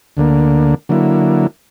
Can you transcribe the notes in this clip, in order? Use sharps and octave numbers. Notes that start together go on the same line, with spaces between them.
D2 D3 A#3
D3 F#3 A#3 E4